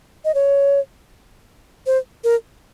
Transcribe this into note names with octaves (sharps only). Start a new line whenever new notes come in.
D#5
C#5
C5
A#4